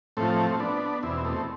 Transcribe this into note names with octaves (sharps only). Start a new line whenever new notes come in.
A2 F3 A3 C4
B3 D4
E2 B2 C4 E4
A3 C4